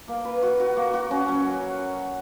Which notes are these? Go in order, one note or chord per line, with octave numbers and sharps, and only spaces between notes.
A#3
B4
F#4
F#4
A#3
F#4
C#4
F#3